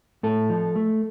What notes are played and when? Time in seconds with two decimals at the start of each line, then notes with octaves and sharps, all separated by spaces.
0.23 A2 A4
0.50 F3
0.76 A3